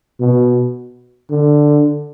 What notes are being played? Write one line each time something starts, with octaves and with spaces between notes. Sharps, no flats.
B2
D3